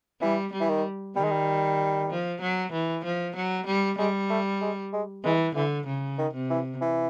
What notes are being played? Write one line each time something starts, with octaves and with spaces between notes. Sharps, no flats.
E3 G3
G3
E3
D#3
D#3 G3
G#3
G3
F3
F#3
E3
F3
F#3
G3
G3 G#3
A3
G#3
G#3
E3 G#3
D3 E3
C#3
D#3
C3
E3
E3